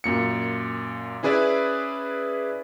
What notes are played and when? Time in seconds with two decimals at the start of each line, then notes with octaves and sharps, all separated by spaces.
0.04 F#2 A#2 C#7
1.23 C#4 E4 G#4 B4 D5 E5